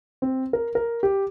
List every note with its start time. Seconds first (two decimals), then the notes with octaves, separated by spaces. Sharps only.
0.22 C4
0.53 A#4
0.75 A#4
1.03 G4